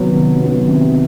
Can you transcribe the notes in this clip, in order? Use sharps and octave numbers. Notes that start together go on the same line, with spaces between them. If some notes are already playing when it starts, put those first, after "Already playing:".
Already playing: C3 D#3 F#3 B3
C3
D#3 F#3 B3
C3